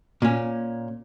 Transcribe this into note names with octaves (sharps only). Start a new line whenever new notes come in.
A#2 C#4